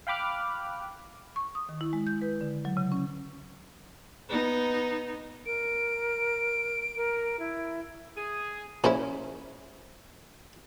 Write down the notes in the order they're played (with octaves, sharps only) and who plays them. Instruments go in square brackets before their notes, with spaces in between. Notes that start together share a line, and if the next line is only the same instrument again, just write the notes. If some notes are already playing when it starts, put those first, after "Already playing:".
[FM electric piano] F5 G5 B5 D6 F6 F#6
[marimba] C#6
D#6
D#3
E4
G#3
G6
B4
D3
F#3
C#3
C#4
[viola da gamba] B3 D#4
[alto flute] A#4 [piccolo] D7
[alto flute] A#4
E4
[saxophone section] G#4
[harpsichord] A#2 G#4 C5 [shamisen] C#4 E4